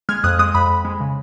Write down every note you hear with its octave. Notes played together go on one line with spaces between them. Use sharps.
G#3 F6 G#6
F2 D#6 F#6
G#3 D#6 F#6
F2 B5 D#6
F2
G#3
C#3